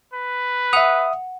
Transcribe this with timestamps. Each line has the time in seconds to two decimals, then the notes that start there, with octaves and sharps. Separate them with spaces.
0.13 B4
0.73 E5 F#5 D#6 F7